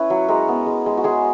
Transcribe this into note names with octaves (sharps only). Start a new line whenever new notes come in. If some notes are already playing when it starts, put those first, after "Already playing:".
Already playing: C#4 E4 B4 C#5
F#3
G#3 A#4
B3
G#3
G#3
F#4
G#3 G#4